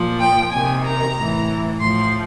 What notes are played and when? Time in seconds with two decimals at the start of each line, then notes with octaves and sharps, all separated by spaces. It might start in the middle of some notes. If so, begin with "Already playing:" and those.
Already playing: A#2 F3
0.21 G5
0.52 C3 D#3 G#5
0.84 A#5
1.16 A2 E3
1.80 A2 F3 C6